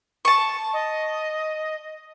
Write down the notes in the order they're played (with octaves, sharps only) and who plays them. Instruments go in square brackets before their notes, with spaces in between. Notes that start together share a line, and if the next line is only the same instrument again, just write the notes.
[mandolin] A5 C#6
[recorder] D#5